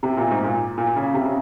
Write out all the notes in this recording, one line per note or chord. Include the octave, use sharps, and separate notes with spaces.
C3
A#2
G#2
A#2
A#2
C#3
C3
C#3